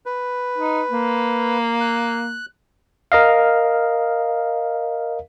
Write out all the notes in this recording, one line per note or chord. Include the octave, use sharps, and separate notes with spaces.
B4
D#4
A#3
F#6
A#4 D#5 F5